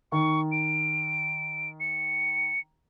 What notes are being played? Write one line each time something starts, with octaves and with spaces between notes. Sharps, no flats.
D#3 C#6
D7
C#7